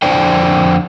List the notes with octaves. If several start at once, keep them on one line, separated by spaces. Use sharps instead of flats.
F2 D3 C5 D5 G5